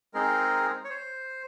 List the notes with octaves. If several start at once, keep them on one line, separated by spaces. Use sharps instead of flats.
G#3 C4 D#4 G#4 A#4
C#5
C5